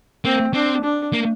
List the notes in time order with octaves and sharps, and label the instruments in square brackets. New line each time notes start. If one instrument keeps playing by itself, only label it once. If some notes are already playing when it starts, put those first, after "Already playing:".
[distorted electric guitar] A#3 [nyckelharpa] C4
[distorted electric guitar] C4 [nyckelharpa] D4
[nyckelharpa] D4
[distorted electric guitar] A#3